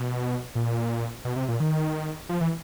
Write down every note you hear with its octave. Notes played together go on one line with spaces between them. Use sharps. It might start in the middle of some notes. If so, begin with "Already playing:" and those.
Already playing: B2
A#2
B2
C3
A#2
D#3
F3
E3